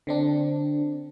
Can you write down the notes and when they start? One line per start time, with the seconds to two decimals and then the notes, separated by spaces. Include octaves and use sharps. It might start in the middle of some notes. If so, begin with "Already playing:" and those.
0.07 D3 C4 D4